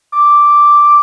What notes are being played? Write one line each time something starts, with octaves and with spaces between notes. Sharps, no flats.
D6